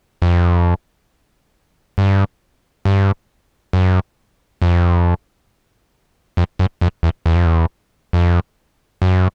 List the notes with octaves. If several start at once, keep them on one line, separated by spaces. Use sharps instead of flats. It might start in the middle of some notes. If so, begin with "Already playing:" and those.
F2
G2
G2
F#2
F2
F2
F#2
F2
E2
E2
F2
E2
F2
F#2